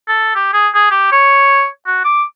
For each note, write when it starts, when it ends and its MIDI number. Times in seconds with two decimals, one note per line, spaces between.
0.08 0.32 69
0.35 0.52 67
0.53 0.68 68
0.74 0.88 68
0.91 1.12 67
1.12 1.66 73
1.86 2.03 66
2.04 2.23 86